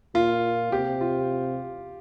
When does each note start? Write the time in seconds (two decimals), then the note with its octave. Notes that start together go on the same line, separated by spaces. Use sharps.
0.14 A#2 F4
0.72 C3 G4
1.01 F4